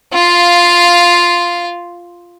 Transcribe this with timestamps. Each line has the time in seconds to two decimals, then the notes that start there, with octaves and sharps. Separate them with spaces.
0.13 F4 F5